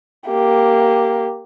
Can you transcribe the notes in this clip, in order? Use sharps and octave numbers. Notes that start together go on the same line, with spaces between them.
A#3 G4